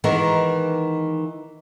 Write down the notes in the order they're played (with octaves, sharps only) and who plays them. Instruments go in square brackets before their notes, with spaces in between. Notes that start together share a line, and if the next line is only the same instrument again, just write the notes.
[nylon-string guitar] D#3 E3 G#3 B3 A#4